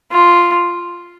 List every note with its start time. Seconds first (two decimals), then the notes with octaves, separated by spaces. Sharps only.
0.12 F4